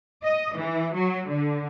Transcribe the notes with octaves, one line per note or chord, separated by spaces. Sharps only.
D#5
E3
F#3
D3